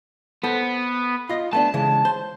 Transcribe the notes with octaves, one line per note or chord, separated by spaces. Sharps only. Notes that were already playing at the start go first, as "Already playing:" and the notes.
B3 A4 C5
F4 D#5
A3 B3 D4 A5
C#3 E3 G#3
C5